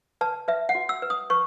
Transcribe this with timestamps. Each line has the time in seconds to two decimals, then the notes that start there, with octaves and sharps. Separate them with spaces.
0.21 B4 A5
0.48 B4 E5
0.69 F#5
0.75 F#4
0.89 E6
1.02 B4
1.10 D#6
1.30 B4 C#6